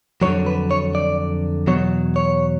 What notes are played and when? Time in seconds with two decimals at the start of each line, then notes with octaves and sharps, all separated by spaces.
0.22 F2 D3 F#3 C#5
0.46 B4
0.71 C#5
0.95 D5
1.67 E2 B2 F#3 C#5
2.16 C#5